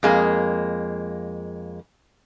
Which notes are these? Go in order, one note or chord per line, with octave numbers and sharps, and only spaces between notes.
F2 G#3 A#3